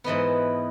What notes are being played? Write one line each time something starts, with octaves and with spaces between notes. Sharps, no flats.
G#2 E3 B3 D#5 F#5